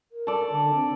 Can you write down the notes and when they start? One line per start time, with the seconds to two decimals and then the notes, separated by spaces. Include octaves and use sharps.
0.12 A#4
0.27 A4 D5
0.51 D3
0.75 C4